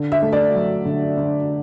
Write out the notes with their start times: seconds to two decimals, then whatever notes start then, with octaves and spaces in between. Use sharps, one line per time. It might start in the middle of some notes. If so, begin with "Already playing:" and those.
Already playing: D3
0.12 E5
0.22 A3
0.33 D5
0.54 F#3
0.85 D3
1.17 D3